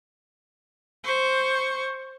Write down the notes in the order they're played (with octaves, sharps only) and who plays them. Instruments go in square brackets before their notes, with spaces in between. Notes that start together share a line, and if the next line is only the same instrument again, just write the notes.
[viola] C5 C#6